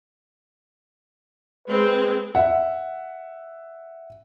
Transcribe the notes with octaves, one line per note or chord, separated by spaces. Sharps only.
G#3 C4 B4
E5 F#5